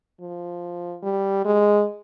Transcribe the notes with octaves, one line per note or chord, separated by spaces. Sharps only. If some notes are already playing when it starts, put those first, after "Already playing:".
F3
G3
G#3